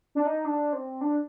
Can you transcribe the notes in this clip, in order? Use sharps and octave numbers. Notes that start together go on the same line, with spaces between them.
D4
D#4
D4
C4
D4